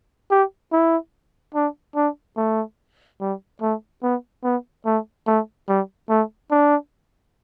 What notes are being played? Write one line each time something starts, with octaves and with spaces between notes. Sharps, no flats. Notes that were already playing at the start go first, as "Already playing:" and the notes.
G4
E4
D4
D4
A3
G3
A3
B3
B3
A3
A3
G3
A3
D4